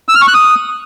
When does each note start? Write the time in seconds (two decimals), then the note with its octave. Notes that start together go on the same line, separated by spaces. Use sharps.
0.09 E6
0.15 F6
0.21 C#6
0.28 F#6
0.34 D#6